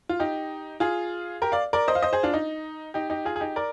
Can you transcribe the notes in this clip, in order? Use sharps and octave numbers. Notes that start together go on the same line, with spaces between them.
F4
D#4 G4
F4 G#4
G4 A#4
D5 F5
A#4 D5
C5 D#5
F5
C5 D#5
G#4 C5
D4 F4
D#4
D#4 G4
D#4 G4
F4 G#4
G#4
D#4 G4
A#4 D5